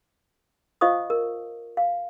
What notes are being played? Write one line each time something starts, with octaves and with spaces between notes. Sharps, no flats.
F4 C5 D#5 F5 C#6 D#6
A#4
F5